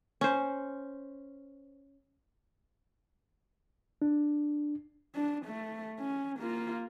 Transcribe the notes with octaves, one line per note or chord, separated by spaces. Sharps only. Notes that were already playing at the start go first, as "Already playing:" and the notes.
C#4 C5
D4
D4
A3
C#4
A#3 F4